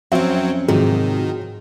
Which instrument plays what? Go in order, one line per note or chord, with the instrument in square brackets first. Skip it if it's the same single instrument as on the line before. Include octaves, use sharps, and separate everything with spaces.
[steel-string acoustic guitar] F2 C#4 [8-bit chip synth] F#3 C4 [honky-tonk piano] F#4 E5
[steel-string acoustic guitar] G#2 C3 [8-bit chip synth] D#3 [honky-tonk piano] F3 F#3 G#3